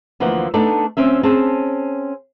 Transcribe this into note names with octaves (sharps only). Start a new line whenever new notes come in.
D2 E3 F3 A#3 F#5
A3 B3 D4 D#4 A4 D5
D2 C4 C#4 E5
C4 C#4 G#4 A5